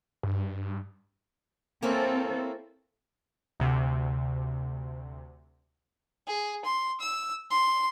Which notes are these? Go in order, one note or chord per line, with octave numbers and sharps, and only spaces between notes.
G2
A#3 C4 C#4 E4 A4
D2 C3
G#4
C6
E6
C6